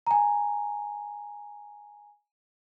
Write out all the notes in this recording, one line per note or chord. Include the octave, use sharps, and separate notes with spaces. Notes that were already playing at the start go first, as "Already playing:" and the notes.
G#5 A#5